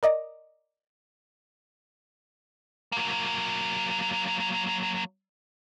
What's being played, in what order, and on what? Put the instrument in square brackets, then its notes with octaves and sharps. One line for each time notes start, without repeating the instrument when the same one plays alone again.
[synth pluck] A#4 D5 D#5 A#5
[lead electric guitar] F#3 A#3